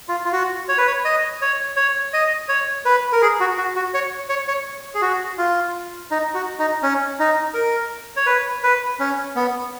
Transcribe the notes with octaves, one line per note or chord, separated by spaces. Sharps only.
F4
F4
F#4
C#5
B4
C#5
D#5
C#5
C#5
D#5
C#5
B4
A#4
G#4
F#4
F#4
F#4
C#5
C#5
C#5
G#4
F#4
F4
D#4
F#4
D#4
C#4
D#4
A#4
C#5
B4
B4
C#4
B3